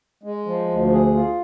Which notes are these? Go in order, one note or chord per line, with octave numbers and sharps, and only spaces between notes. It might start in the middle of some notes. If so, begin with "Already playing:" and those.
G#3
F3
D2
G#4
F4